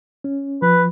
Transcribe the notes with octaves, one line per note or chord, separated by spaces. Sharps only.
C#4
F3 B4